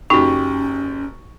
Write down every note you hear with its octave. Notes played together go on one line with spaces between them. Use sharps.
F#1 C#4 D#4 F#4 G4 C#6